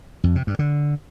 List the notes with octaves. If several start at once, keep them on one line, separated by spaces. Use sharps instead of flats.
F2
C3
G2
D3